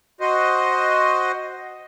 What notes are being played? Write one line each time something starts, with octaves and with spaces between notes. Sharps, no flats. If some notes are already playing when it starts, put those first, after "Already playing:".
F#4 C5 D#5